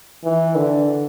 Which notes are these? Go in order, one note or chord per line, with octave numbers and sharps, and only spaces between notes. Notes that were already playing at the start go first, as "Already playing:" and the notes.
E3
D3